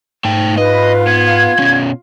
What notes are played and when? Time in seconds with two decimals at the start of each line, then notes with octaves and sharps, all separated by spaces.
0.25 G#2 A3 G5
0.57 F4 B4 D#5 F5
1.07 B3 G#6
1.59 B2 C#4